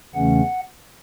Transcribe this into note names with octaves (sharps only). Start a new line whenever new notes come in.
E2 C#3 E3 A3 C#4 F#5